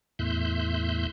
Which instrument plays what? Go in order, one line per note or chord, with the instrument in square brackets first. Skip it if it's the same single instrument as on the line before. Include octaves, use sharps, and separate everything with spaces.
[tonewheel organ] E2 A2 E5 C6 F#6 G6